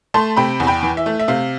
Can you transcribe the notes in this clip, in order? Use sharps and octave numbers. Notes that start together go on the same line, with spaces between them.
A3 A5 C6
C3 G5 B5
E2
G5 B5
E3
E5
A3
E5
C3 F5